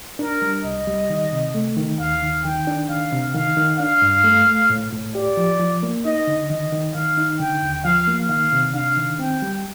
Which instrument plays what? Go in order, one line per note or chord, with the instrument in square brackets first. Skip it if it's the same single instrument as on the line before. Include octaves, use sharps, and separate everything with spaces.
[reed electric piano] D4 [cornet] A#4
[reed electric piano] G3
[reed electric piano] C2 [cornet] D#5
[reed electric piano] G3
D#3
C3
A3
D#3
[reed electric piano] D#2 [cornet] F5
[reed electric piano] D#3
[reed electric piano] D#3 [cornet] G5
[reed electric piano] D4
[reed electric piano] D#3 [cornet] F5
[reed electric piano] C3
[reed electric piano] D#3 [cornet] F5
[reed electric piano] D#3
[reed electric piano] D4 [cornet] F5
[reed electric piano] G2
A3
A3
A2
A2
[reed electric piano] G4 [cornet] D5
[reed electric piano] F3
F3
A#3
[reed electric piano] D#4 [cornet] D#5
[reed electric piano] D3
[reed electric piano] D#3 [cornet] D#5
[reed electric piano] D#3
[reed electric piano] D#3 [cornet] F5
[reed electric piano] D#4
[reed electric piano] D3 [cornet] G5
[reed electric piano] D#2
[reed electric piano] F3 [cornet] F5
[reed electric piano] A#3
[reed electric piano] D#3 [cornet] F5
[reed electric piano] C3
[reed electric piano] D4 [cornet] F5
[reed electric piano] D#3
[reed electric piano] C4 [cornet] G5
[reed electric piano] G3